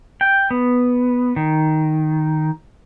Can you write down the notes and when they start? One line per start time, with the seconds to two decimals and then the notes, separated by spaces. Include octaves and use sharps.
0.21 G5
0.51 B3
1.36 D#3